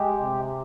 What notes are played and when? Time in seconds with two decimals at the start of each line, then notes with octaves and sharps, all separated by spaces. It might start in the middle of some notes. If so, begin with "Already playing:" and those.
Already playing: G#3 G4
0.20 C3